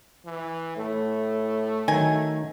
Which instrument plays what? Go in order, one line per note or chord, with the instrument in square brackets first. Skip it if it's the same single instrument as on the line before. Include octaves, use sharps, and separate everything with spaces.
[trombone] E3
[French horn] A2 [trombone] A3
[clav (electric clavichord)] D#3 F#3 [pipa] G#5